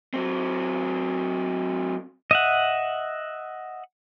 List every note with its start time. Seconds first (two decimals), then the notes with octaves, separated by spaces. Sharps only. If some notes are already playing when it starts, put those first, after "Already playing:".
0.14 F#3 C4
2.31 D#5 E5 F#5